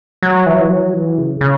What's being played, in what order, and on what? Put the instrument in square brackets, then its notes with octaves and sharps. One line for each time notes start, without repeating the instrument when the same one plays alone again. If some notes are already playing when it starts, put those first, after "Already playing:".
[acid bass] F#3
E3
F#3
E3
F#3
E3
C#3
C#3